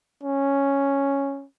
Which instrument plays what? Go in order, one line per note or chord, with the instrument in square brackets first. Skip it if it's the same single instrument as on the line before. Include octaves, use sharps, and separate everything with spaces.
[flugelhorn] C#4